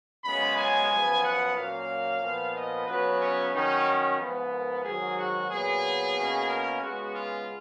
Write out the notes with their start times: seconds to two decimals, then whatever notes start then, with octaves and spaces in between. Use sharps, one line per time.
0.25 F#2 C#3 G#3 B3 B5
0.57 G#5
0.90 F#2 F3 B3
1.22 F#5
1.56 A#2 F#3 A#3 C#4 F5
2.21 A#2 F3 B3
2.54 D#5
2.87 C#3 F#3 B3 B4
3.20 C#4
3.53 D#3 F#3 C#4 D#4
4.19 G#2 F3 B3
4.51 A#4
4.84 G#2 D#3 F#3 G#4
5.17 F#4
5.50 A#2 F#3 B3 G#4
6.16 B2 A#3 C#4
6.49 A#4
6.81 C#3 G#3 B3 F#4
7.15 F4